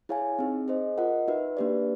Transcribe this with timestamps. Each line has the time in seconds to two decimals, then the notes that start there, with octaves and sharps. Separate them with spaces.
0.09 E4 G#4 C#5 F5 G#5
0.39 C4 D#4 G#4
0.68 G#4 C5 D#5
0.98 F4 A#4 D#5 F#5
1.28 D#4 F#4 B4 E5
1.57 A#3 D4 G4 B4 D5